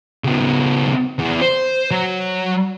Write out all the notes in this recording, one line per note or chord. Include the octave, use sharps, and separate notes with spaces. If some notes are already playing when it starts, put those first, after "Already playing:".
C#3 B3
E2
C5
F#3